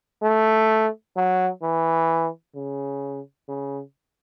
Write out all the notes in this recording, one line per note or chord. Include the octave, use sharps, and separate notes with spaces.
A3
F#3
E3
C#3
C#3